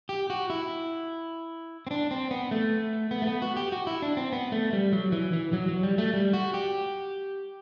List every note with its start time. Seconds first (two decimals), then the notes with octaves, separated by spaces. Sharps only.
0.09 G4
0.30 F#4
0.50 E4
1.87 C4
1.91 D4
2.11 C4
2.31 B3
2.51 A3
3.11 B3
3.22 A3
3.27 B3
3.42 F#4
3.56 G4
3.72 F#4
3.87 E4
4.02 D4
4.17 C4
4.32 B3
4.52 A3
4.73 G3
4.93 F#3
5.12 E3
5.33 E3
5.53 F#3
5.68 F#3
5.83 G3
5.98 A3
6.14 G3
6.33 F#4
6.54 G4